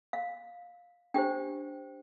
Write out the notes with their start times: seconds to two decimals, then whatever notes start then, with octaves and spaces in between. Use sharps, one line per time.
0.13 F5
1.14 D4 G4 C5 G5